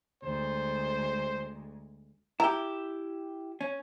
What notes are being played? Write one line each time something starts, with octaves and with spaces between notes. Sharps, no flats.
D2 G#3 C5
E4 G4 A#5
C#4